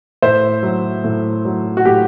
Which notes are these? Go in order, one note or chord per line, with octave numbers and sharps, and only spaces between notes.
A2 C5 E5
F#3
A2
F#3
F#4
A2 G4